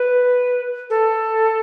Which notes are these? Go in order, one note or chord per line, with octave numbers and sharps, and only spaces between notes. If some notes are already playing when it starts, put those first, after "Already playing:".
Already playing: B4
A4